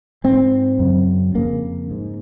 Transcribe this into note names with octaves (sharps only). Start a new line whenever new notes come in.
G#2 C4
F#2 C#3
F2 C#3 A#3
G#2